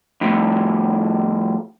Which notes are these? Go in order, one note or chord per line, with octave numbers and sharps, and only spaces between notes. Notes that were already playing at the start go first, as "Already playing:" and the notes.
F2 A2